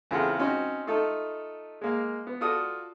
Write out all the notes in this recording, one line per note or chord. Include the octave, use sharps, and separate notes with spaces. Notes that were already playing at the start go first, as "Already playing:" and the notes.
E2 C#3 C4 F4 A4 F#5
C4 C#4 D#4 F#4
A3 D#4 F4 A4
G#3 A#3 F5
B3
F4 F#4 A4 D5 D#6